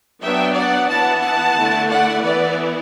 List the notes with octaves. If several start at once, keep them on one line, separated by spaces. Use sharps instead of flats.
F#3 B3 D4 E5 G5
D5 F#5
E3 B3 E4 F#5 A5
F#5 A5
D3 A3 E4
D5 F#5
E3 B3 E4 B4 D5